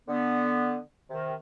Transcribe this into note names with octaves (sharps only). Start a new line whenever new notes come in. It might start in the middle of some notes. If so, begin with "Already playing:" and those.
D3 B3
C3 D#3